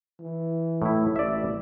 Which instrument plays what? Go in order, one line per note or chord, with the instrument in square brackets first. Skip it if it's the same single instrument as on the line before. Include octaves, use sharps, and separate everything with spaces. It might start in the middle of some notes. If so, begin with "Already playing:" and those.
[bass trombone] E3
[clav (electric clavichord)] A2 E4
[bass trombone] A1 [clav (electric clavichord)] D5 E5